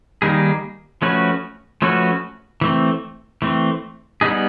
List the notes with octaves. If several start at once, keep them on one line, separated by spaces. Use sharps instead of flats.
D#3 G3 A#3 D#4 G#4
F3 A3 C#4 F#4 B4
F3 A3 C#4 F#4 B4
E3 A3 C4
E3 A3 C4
G3 B3 D#4 G#4